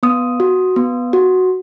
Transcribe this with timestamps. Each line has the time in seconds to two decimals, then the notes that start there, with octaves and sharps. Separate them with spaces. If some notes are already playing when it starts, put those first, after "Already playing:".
0.03 B3 D#6
0.40 F#4
0.76 B3
1.13 F#4